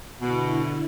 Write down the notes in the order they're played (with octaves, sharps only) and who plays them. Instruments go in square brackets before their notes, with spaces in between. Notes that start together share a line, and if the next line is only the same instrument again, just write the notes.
[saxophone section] B2 [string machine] D3 E4